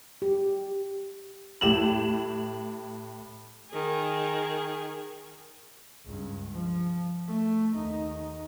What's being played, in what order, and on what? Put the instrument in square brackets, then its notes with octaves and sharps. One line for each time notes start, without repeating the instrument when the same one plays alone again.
[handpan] G4
[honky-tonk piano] A2 G4 E7 F#7
[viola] D#3 G#4
[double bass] C#2 G2
F3
A3
D#2 D#4